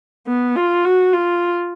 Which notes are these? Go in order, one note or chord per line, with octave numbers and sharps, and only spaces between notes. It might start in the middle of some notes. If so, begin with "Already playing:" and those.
B3
F4
F#4
F4